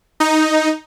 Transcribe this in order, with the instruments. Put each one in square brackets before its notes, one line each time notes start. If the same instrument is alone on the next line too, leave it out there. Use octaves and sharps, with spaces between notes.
[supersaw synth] D#4